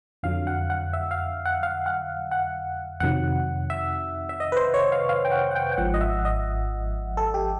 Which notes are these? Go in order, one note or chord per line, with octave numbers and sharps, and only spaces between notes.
F2 D3 F#3 F5
F#5
F#5
E5
F5
F#5
F5
F#5
F#5
F2 C3 D#3 F#3 F#5
E5
E5
D#5
B4
C5
C#5
F5
F5
G5
F#5
F#5
G5
G5
G#1 G#2 F3 F#5
D#5
E5
D#5
A4
G4